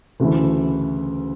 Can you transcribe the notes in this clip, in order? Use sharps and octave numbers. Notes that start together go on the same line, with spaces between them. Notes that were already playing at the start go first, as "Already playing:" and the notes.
D2 C#3 E3 A3 E4